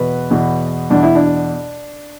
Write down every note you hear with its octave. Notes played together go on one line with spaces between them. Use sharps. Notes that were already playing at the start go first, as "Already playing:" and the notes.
Already playing: E2 B2 B4
E2 B2
E2 B2 D4
E4
D4